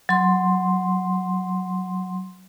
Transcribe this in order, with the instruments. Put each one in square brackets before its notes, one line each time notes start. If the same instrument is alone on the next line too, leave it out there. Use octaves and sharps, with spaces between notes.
[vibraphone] F#3 C6